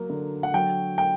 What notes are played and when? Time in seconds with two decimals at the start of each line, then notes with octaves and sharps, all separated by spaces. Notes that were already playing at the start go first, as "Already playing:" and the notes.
Already playing: F#3 A#3
0.10 D3
0.43 F#5
0.54 F#3 G5
0.98 G5